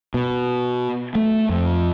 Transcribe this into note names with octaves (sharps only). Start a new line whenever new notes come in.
B2
A3
F2